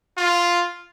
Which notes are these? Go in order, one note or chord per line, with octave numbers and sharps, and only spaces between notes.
F4